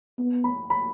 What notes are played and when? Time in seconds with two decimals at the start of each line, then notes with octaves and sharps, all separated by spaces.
0.19 B3
0.44 B5
0.70 B5